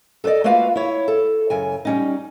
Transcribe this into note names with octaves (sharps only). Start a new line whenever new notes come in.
A4 B4 C5 D5 D#5
A3 A#3 F4 F#4 B4 F5
E4 C#5
A4
F#2 C#3 G#5
G3 C#4 D#4